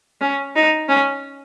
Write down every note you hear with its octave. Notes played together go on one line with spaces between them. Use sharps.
C#4
D#4
C#4